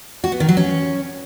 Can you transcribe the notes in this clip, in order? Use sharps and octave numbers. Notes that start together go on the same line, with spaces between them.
F#4
B3
D#3
F#3
C#4